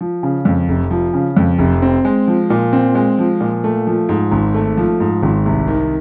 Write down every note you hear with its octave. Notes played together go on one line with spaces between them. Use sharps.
F3
C#3
F2
F1
F3
C#3
F2
F1
C4
G#3
F3
A#2
C4
G#3
F3
A#2
A3
F3
G#2
G#1
A3
F3
G#2
G#1
C2
D#3